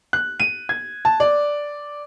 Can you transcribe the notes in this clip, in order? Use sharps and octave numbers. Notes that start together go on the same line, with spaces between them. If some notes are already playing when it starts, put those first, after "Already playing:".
F#6
D#7
G#6
A5
D5